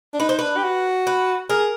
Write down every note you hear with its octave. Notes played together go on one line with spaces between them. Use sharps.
D4
D#4 B4
C5
D4 B4
G4
F#4
B4
G#4 A#4